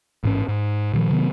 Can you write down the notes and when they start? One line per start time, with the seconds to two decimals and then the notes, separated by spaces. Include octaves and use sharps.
0.24 A1 G#2 C#4
0.48 G#2
0.94 A#2 D#3 F3
1.10 C3 D#3 F#3 B3